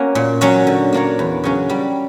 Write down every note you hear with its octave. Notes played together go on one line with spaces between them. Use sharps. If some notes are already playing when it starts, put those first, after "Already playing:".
Already playing: A#3 C#4 F#4
A#2
F#3 C#4 F#4
D3
A#3 D4 A#4 C#5
E2
C#3 F#3 C#4
G3